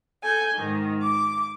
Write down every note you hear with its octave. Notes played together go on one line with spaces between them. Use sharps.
A4 G#5 G6
G#2 D#3
D6